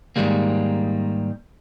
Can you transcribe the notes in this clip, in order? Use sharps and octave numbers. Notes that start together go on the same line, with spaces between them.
G#2 B2 D#3 G3 G#3 A#3